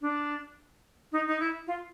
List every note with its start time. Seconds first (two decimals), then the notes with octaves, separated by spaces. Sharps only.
0.01 D4
1.12 D#4
1.27 D#4
1.40 E4
1.67 F4